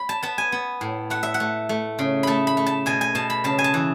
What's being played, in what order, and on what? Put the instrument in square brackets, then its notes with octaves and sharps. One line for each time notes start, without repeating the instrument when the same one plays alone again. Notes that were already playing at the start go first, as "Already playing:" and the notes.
Already playing: [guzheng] B5
A5
B3 A5
G#5
B3
A2
A3 F#5
E5
F#5
A3
A3
C#3
A3 A5 B5
B5
A3
A5
B2 G#5
G#5
B2 A5
B5
C#3 A5
G#5
A5
E3